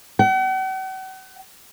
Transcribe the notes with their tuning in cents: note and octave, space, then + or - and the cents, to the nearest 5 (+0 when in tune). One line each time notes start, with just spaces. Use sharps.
F#5 +45